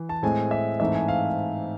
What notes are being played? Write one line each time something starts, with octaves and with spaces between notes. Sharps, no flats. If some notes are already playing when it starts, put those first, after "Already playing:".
Already playing: E3
A5
A2 G#3 C4 G#5
E5
G#2 E3 A3 C4 E5
G#5
F5